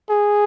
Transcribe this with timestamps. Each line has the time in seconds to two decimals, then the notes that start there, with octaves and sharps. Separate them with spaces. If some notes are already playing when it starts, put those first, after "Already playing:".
0.10 G#4